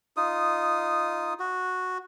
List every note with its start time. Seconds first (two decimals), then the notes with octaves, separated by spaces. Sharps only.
0.17 D#4 F4 D#6
1.40 F#4